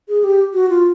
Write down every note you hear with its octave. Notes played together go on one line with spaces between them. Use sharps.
G#4
G4
F#4
F4